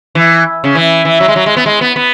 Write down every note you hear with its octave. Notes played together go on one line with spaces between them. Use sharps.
E3
C#3
E3
E3
F#3
G#3
F#3
G#3
B3
G#3
B3
B3